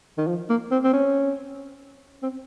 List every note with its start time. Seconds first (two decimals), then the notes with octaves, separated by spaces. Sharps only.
0.18 D#3
0.28 F3
0.50 A#3
0.71 C4
0.84 C4
0.93 C#4
2.23 C4